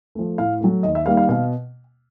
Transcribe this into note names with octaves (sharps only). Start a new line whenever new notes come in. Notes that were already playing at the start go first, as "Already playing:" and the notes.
F3 A3
A2 F5
F#3 A3
D#2 D#5
E5
D#3 G3 A#3 F5
F5
B2 F5